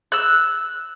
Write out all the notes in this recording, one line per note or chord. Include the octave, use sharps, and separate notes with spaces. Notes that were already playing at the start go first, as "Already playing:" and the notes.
E6 F#6